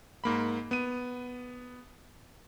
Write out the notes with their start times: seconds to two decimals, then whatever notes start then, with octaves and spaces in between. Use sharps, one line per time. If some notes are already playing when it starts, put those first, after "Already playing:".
0.24 G#2 A#3 B5
0.71 B3 D#7